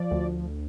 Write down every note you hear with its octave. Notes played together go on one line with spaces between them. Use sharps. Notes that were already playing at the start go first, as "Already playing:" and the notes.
Already playing: F3 D5
D2